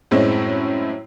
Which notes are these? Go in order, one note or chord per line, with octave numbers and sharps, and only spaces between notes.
F#2 A2 G#3 C4 C#4 E4